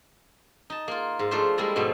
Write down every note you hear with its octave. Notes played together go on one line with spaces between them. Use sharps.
D#4 A5
A#3 F4
G#2
F3 A3 D4 F4 C5
G3 G#3 A#3 E4 D5 A#5
G#2 B2 F3 A3